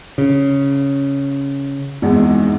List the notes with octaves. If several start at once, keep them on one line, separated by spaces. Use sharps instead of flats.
C#3
G#1 E2 G#2